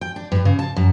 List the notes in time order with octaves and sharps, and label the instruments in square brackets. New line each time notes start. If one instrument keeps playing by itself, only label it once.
[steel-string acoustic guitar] G5
D4
G2
C#3
A5
F#2